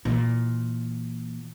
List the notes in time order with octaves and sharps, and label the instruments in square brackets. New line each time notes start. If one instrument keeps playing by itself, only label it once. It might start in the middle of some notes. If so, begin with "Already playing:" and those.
[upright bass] A#2 E3